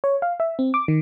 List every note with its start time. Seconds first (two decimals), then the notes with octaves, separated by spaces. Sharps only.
0.04 C#5
0.22 F5
0.40 E5
0.59 C4
0.74 D6
0.88 D#3